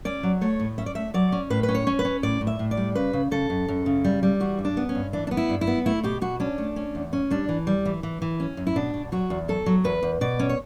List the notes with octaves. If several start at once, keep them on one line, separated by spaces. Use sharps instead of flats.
C#4 D5
F#3
A3 C#5
A2
C#4 E5
D5
A3 E5
F#3 D5
C#4
A2 B4
B4
C#4
C#5
C#4
B4
C#4
A2 D5
A2
E5
A2
D5
G3
C#3 B4
C#3
C#3 A4
F#2
F#2
C#3
G3
G3
E3 F#4
G2
D4
B3
C#4
G2
E3 D4
D4
B3
E4
G2
E4
B3
A3 E4
B2 G4
B2 F#4
C#4 D4
A3
C#4
E2
C#4
G3 D4
E3
G3
E3
E3
E3
C#4
F#2
E4
B2 D4
B2
F#3 F#4
E2
F#3 A4
F#3
E2 B4
E2
B2 D5
C#4
C#5